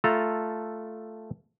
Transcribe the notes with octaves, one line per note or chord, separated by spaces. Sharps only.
A3 F4 A4 A#5